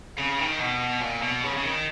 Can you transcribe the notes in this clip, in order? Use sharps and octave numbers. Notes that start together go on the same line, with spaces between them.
C#3
D#3
B2
A#2
B2
C#3
C#3
D#3